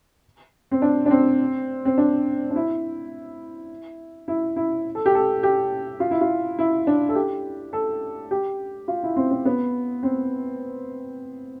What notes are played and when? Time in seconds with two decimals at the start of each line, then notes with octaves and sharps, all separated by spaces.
0.71 C4
0.82 D4
1.06 D4
1.11 C4
1.85 C4
1.98 D4
2.51 D4
2.56 E4
4.28 E4
4.56 E4
4.95 A4
5.06 G4
5.15 A4
5.43 G4
6.00 F4
6.11 E4
6.21 F4
6.59 E4
6.87 D4
7.09 A4
7.15 G4
7.73 A4
8.31 G4
8.88 F4
9.03 E4
9.16 C4
9.31 C4
9.45 B3
10.03 C4